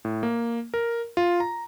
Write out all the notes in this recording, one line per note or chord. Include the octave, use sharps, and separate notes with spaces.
A2
A#3
A#4
F4
A#5